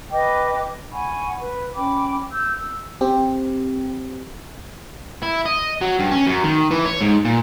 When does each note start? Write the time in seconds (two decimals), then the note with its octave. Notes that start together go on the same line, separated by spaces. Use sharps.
0.11 B4 D#5 G5 D6
0.91 F#5 G#5 B5 C#6
1.39 B4
1.75 C#4 G5 B5 D6
2.31 E6 G6
2.57 E6
3.01 C4 G4
5.23 E4
5.46 D#5
5.81 F#3
5.99 G2
6.11 C#4
6.27 F#2
6.44 D#3
6.71 E3
6.85 C#5
7.01 G#2
7.25 A#2